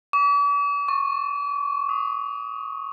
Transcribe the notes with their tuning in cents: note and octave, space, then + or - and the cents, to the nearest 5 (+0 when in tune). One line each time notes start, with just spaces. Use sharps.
D6 -45
C#6 -10
D#6 +20